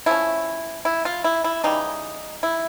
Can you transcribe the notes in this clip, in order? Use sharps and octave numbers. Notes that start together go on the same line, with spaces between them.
F3 A3 C#4 E4
E4
F4
E4
E4
C#3 E3 G3 D#4
E4